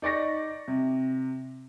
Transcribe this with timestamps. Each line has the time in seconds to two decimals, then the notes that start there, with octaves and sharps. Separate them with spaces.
0.02 D#4 D5 C#6 A#6
0.68 C3